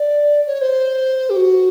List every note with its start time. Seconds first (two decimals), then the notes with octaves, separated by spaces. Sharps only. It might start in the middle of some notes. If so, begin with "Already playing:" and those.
Already playing: D5
0.47 C#5
0.61 C5
1.30 G4
1.36 F#4